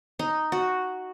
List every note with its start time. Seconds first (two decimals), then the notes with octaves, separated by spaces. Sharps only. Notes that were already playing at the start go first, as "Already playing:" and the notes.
0.19 D#4
0.52 F#4